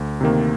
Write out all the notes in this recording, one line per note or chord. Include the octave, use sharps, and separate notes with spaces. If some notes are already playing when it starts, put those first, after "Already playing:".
Already playing: D2
C3 D#3 A#3